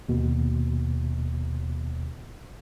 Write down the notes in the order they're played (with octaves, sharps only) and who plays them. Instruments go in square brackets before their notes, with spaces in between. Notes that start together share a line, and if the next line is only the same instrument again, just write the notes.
[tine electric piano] D#2 B2